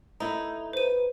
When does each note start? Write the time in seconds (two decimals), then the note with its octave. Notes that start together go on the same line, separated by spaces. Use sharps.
0.20 A3 D#4 E4
0.73 B4 C5 D#7